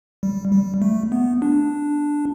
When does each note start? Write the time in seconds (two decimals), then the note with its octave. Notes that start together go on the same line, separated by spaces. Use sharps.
0.23 G3
0.52 G3
0.82 A3
1.12 B3
1.42 D4